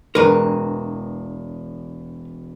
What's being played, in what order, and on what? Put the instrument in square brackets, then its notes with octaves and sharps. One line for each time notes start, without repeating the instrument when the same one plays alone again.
[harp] E1 [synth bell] G#3 D4 [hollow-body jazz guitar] A#4 B4